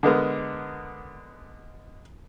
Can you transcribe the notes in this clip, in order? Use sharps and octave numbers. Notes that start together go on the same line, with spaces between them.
D3 G#3 B3 A#4